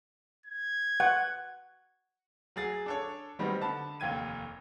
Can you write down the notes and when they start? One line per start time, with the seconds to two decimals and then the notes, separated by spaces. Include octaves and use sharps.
0.46 G#6
1.00 F#5
2.56 F#3 G#4 A6
2.86 D4 A4 C#5
3.39 D#3 F#3 G3 B3 C4 D#4
3.61 D3 A5 B5
4.00 F1 D#2 G5 G#6 D#7